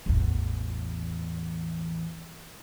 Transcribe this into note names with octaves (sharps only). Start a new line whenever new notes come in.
A1 E2